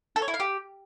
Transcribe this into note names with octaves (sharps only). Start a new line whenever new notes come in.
A4
C#5
E4
F5
G4